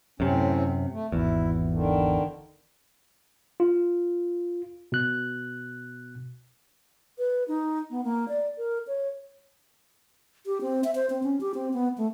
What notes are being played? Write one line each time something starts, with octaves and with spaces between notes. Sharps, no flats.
F#2 A2 C3 C4 C#4
A3
G#1 E2 E4
D3 D#3
F4
B2 F#6
B4
D#4
B3
A#3
D5
A#4
C#5
G4
C4
E5
C5
C4
C#4
G4
C4
B3
A3